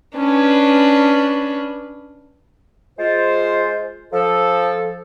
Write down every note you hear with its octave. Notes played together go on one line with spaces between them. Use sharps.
C#4 D4 B4
G#3 F4 C5
F3 A4